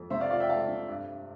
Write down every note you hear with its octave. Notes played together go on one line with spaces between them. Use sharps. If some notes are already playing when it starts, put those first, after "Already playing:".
Already playing: F2
C3 C5 E5
D5 F5
F3 D5 F5
E5 G5
A3 F5 A5
C3
G2
G2